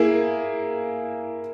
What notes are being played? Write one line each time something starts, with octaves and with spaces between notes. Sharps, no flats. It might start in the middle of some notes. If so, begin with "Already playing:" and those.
Already playing: A#3 E4 G#4